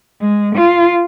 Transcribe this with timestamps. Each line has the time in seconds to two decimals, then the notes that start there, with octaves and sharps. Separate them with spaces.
0.21 G#3
0.55 F4